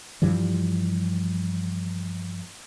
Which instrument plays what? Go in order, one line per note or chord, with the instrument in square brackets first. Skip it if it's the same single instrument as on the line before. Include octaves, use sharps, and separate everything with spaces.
[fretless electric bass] G2 E3 F3 G3